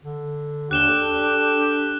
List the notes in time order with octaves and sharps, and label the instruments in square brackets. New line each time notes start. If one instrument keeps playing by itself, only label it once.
[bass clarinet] D3
[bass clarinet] D#2 [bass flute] D4 [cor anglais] G4 [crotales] F#6 E7 G7
[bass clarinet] A4